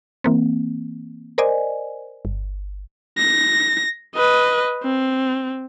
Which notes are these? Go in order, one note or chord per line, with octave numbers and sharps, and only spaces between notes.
E3 A#3 C4
A#4 C5 D5 D#5 G#5
G1
A#6
B4 D#5
C4